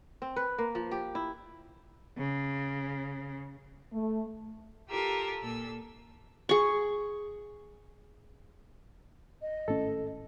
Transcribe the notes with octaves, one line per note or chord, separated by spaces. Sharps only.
C4
B4
A#3
F3
G4
E4
C#3
A3
F4 G4 A4 A#4 E6
A#2 A4 E6
G#4 C#6
D#5
G#1 A2 C#4 A4